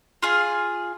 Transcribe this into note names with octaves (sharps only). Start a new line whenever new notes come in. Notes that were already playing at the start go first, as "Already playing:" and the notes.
F4 G#4